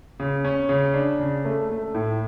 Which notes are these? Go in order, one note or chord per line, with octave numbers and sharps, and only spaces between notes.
C#3
C#4
C#3
D4
C#3
A3
A3
A2